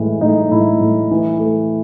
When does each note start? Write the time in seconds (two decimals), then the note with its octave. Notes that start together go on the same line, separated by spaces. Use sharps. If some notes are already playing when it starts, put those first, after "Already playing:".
Already playing: A2 E3 G#3
0.21 A2 D#4
0.51 A2 E4
0.81 A2
1.11 E3
1.40 A3